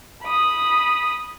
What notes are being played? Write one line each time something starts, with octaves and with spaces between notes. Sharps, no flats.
B5 D#6